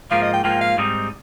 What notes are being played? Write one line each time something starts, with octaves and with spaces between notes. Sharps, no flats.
G#2 F3 A#3 F4 F5
D#5
G5
G#2 F3 A#3 F4 G5
F5
G#2 G3 C4 D#4